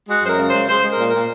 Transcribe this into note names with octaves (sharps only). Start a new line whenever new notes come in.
G#3 F#4
F#2 A#4 C5
C#3
G#3 C5
G#3 C5
G#3
A#4
A#2
A#4
A#2